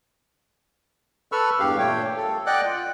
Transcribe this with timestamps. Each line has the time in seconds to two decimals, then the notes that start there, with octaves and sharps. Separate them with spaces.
1.32 A4 B4 B5 C#6 E6 F6
1.60 E2 G2 G4 F5
1.78 A#2 A3 C#5 G5
2.17 A4
2.46 D5 D#5 F#5 G5 D6 F#6
2.65 F4